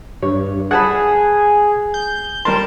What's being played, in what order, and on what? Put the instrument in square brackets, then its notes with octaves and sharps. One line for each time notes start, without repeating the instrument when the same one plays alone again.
[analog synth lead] G2 [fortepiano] C#5
[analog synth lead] G#4 [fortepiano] F#5 A5 B5
[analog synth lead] G6
[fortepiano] G3 A#4 C6 [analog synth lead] A5